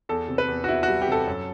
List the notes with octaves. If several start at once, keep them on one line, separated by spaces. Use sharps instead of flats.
E2 A4
C3
B4
E2
F#4
E2 E4
G3 F#4
G4
C3 A4
F#2